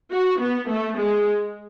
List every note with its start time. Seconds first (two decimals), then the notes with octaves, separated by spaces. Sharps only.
0.12 F#4
0.40 B3
0.69 A3
0.98 G#3